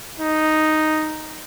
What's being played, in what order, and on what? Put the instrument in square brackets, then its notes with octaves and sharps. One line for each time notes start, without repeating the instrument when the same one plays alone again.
[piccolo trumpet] D#4